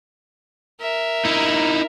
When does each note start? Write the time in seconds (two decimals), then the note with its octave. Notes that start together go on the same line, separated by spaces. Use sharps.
0.81 A#4 E5
1.25 D#4 E4